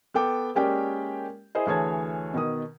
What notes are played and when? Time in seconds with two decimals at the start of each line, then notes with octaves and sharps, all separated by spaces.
0.14 B3 A4 G5 D6
0.55 G#3 A#3 C#4 G4 D5 G5
1.55 E4 G#4 C5 D#5
1.66 D2 E3 G#4 C#5 A5 G#6
2.34 B2 D#3 D#6